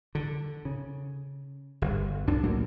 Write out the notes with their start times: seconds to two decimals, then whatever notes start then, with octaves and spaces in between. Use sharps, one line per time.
0.15 D3
0.65 C#3
1.82 G1
2.28 C2 F#2 D4
2.43 C2 A2 F#3 A#3